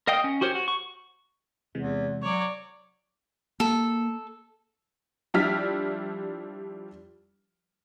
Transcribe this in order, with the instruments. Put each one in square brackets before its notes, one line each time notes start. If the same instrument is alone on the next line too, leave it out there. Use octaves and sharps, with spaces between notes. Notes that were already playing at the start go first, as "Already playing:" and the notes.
[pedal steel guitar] A#4 D#5 F5 G5 D#6
C#4
F#4 G4 A#4 C5 C#5
F#4
C#6
[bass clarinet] E2 [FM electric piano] C3 E3 G#3
[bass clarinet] F#3 [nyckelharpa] C#5 D5
[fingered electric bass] A#3 [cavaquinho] A4
[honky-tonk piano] F3 G3 D4 E4 F6 B6